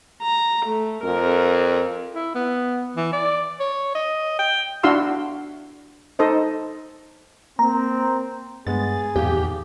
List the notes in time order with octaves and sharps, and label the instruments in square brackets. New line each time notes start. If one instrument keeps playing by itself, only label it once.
[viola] A#5
A3
[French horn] F2 [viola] A#4
[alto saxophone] E4
B3
E3
D5
C#5
D#5
G5
[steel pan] D4 E4 F#4 F5 C6 E6
D#4 A4 C5 D#5
[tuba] A#3 [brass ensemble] C4 [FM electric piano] A#5
[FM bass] G2 [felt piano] G#3 B3 [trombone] G#4 [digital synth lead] A6
[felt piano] D#1 G#1 [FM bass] E2 [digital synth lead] G4